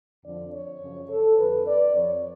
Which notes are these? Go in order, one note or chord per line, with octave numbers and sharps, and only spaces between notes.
F2 D3 F3 D5
C#5
F#2 C#3 F3
A4
F2 D3 F3 B4
D5
F2 F3 C#5